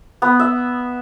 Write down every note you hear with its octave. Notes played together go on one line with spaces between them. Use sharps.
B3
E5